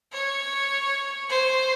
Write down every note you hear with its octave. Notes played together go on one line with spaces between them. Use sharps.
C#5
C5